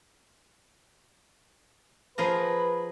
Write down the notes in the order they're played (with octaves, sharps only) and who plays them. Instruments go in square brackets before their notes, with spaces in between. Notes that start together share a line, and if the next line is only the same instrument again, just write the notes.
[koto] F3 G#4 A#4 [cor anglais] B4